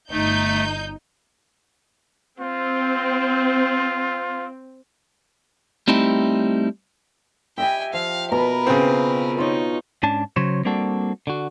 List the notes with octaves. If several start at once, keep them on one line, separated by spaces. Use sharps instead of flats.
G1 A3 D#4 G6
C4 F4
G3 A3 C4 D#4 E4 G4
G4 D#5 E5 G5 G#5
F3 F5
B2 A#4 B4 A#5
C#3 C4 F4
D#4 F4 C#5
G#2 C#4 D4 A5
C#3 F#3 C5 C#5
G3 A#3 C4 D4 F#4 A4
D3 F#4